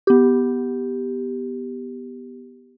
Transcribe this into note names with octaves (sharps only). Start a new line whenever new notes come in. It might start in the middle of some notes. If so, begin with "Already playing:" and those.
B3 G4